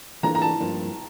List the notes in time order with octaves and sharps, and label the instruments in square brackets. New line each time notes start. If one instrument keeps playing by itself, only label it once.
[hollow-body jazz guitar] E3 A#3 D4 F4 A4 [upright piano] A#5
[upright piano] A#5
A5
[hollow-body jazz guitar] G2 F3 A#3 D4